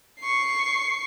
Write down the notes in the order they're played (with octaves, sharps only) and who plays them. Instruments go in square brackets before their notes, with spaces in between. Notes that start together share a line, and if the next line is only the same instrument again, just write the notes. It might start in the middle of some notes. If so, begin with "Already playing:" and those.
[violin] C#6 C7